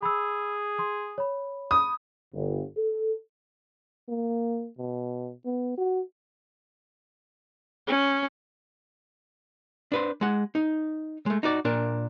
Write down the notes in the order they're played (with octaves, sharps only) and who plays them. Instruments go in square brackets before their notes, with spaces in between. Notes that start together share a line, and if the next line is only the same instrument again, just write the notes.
[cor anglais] G#4 [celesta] B5 E6
[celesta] C6 D#6
C#5 B5
[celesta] B5 [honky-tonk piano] D#6
[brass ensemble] G1
A4
[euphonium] A#3
B2
B3
F#4
[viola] C#4
[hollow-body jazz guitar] D4 B4 C5
G#3 F#5
D#4
G#3 A3
D#4 F#4 D5
A#2 D4 A#4